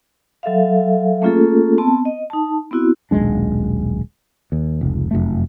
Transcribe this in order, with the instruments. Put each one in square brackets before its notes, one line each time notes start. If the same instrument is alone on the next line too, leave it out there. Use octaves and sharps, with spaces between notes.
[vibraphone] F#3 A4 E5 F5
A3 A#3 C#4 F4 G#4 A4
B3 C4 A5
D#5
D#4 A5
B3 C4 E4 F#4
[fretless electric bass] D#1 B1 G#3 D4
D#2
F1 C#2
F1 F#2 A3